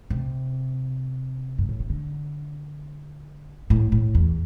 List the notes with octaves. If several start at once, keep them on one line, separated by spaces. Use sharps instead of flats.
C3
G2
A2
C3
D3
A2
A2
E2